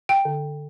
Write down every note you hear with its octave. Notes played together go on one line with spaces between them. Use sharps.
G5
D3